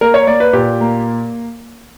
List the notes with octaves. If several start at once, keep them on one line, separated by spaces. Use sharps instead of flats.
A#3 A#4
C#5
A#3 D5
B4
A#2 G4
A#3